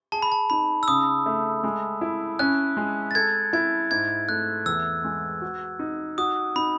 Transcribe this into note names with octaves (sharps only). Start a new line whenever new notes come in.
G#4 A5
B5
A5
D#4 B5
E6
C#3 D#6
A3
G#3
E4
C#4 F#6
G#3
A6
A4 G#6
E4 G#6
G#2 G#6
A3 F#6
E2 E6
G#3
F#4
D#4
F#4 D#6
D#4 B5